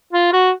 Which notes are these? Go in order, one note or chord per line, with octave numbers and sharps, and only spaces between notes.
F4
F#4